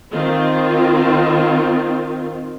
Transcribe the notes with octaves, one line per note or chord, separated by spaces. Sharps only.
D#3 C4 F4